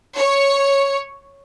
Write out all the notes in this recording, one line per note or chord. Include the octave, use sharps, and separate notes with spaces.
C#5